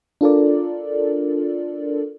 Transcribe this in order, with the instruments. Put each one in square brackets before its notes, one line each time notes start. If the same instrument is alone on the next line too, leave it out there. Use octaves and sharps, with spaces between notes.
[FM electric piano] D4 F4 A4 A#4 D5